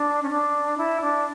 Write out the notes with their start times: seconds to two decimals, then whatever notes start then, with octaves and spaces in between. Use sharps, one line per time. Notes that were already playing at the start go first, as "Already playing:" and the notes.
Already playing: D4
0.23 C#4
0.30 D4
0.78 E4
1.01 D4